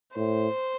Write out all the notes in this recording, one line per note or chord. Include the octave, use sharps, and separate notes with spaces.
A2 C5